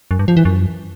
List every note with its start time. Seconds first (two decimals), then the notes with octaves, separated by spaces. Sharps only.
0.11 F#2
0.19 G2
0.28 F3
0.37 E3
0.45 F#2